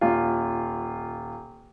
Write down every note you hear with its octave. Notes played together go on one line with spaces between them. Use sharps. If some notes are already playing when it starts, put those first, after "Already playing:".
D#1 F4